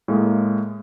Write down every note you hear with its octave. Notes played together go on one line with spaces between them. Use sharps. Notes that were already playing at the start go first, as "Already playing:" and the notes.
A2 G#3 A#3